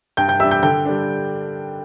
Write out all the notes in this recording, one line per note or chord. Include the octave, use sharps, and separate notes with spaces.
G2 G5 G6
G5 G6
G3 D4 E5 E6
G5 G6
D3 G5 G6
G3 D4